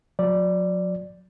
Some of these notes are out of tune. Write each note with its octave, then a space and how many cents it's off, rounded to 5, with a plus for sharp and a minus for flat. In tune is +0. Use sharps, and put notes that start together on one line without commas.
F#3 -35 D5 +0